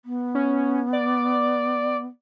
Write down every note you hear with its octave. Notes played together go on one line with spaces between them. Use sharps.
B3
C#4
D5